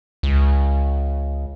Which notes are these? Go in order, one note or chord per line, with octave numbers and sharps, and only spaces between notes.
C#2